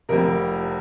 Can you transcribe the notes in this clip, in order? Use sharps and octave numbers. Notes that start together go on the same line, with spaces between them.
F1 F2 C3 A#4